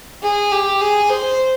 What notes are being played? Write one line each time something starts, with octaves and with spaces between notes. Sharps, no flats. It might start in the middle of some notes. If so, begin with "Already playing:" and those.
G#4
G4
G#4
C5